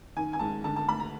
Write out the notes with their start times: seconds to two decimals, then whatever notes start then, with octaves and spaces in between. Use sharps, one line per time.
0.16 D#3 G#5
0.33 G#5
0.39 G#2 A5
0.64 D3 A5
0.76 A5
0.88 D2 B5
1.00 A#5